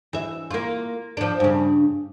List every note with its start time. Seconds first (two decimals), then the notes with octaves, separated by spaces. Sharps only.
0.13 E3 E5
0.51 A#3 F4
1.17 F3 D4
1.40 G2 C#3